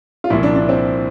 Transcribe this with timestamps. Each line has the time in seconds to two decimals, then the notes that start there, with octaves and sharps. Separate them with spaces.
0.24 F4
0.30 C2 A#2 F3 E4
0.43 D4
0.56 D4
0.69 C4